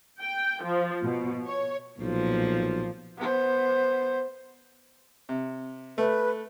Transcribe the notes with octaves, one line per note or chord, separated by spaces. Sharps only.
G5
F3
B2
C#5
B1 A#2 F3
B3 C5
C3
A3 B4